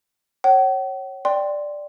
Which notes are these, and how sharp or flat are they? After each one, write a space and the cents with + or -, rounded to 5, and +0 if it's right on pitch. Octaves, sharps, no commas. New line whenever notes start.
C#5 -20 F#5 +45
D5 +0 G5 +0 C6 +0